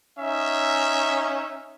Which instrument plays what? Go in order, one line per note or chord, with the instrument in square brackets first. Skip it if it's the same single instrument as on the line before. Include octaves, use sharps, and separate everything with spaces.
[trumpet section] C#4 D#4 [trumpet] E5